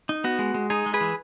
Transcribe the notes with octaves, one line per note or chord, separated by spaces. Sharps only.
D#4
B3 F#4
G#3
G#3
D#4 G#4
G#3
G#4 B4
E3